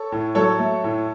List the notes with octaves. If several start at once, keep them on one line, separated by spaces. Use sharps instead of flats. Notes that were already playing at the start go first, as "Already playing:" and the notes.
Already playing: A4 C#5
A2
F#3 A4 C#5
A3
A2